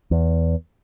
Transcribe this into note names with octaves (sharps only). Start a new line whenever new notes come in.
E2